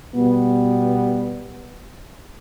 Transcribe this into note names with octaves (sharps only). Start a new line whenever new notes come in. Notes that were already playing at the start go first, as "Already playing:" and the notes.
B2 G3 B3